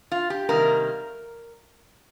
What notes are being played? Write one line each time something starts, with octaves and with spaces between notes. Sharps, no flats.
F4
G4
C3 D#3 G3 A#3 A#4